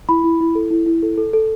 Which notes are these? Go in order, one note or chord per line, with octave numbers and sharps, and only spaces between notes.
E4 B5
E4
E4
A4
E4
E4
A4
A4
A4